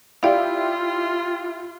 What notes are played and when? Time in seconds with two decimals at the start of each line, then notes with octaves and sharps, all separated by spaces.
0.23 E4 F4 G4 D5 F5